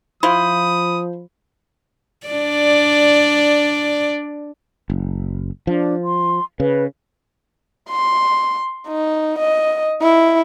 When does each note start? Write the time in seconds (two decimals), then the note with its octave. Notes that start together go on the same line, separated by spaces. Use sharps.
0.23 F3 E4 F4 C5 B5 D#6
2.27 D4 D5
4.90 F#1
5.67 F3 D4
6.04 C6
6.60 C#3 B4
7.89 C6
8.88 D#4
9.39 D#5
10.02 E4